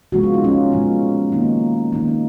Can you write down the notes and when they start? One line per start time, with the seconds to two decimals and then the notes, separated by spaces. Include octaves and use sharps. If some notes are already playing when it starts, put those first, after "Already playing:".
0.12 C#3 F3 G#3 B3 F#4
0.23 F4
0.34 D#4
0.44 C#4 F4
0.72 A#2 F3 G#3 B3
1.32 D#3 A#3 D#4
1.92 D#3 A#3 D#4
2.08 D#4